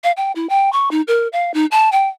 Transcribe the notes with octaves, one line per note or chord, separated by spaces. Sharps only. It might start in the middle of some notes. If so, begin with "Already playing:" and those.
F5
G5
E4
G5
C#6
D#4
A#4
F5
D#4
A5
G5